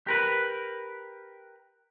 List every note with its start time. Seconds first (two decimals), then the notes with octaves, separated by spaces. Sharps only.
0.07 G4 A#4 B4